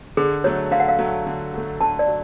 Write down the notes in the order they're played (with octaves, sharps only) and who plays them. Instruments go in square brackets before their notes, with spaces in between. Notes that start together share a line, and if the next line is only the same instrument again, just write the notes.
[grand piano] D3 [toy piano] G#4
[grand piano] F#3 A3 [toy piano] C#5
[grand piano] D3 [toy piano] F5
[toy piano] F#5
F5
[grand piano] F#3 A3
D3
F#3 A3
[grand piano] D3 [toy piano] A5
[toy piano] D5
[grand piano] F#3